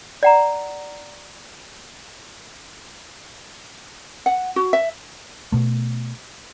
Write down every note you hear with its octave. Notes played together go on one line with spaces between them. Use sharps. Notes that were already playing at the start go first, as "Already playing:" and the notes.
D5 F#5 A#5
F#5
F#4
E5
B2 A3